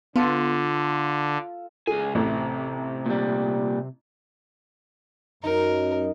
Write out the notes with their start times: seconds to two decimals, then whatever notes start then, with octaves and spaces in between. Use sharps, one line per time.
0.16 D3 B3 F4 A4
1.87 C#2 G#4 G#5
2.15 A1 C3
3.06 A#2 G3
5.44 F#2 D#4 A#4